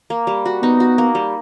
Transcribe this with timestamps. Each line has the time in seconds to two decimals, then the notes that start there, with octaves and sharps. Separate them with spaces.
0.10 A#3
0.27 G3
0.45 F#4
0.62 B3 D#4
0.80 F#4
0.98 A#3
1.15 G3